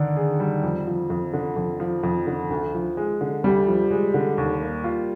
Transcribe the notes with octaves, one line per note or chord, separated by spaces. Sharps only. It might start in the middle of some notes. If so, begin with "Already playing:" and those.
Already playing: D3 D#3 D4
G#4
G3
F2
F3
F2
D3
F2
F3
F2
D3
D2
F3
G#3
D3
D2 G3
F3
G#3
D3
D#2
A#3
F4